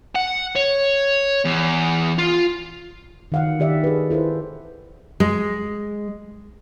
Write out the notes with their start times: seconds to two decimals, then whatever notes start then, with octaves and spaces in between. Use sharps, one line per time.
0.15 F#5
0.56 C#5
1.45 E2
2.18 F4
3.32 D#3 F5 F#5
3.59 D#3 G4 D5 E5
3.84 G#4 B4
4.10 E4 A4 B4 C5
5.20 G#3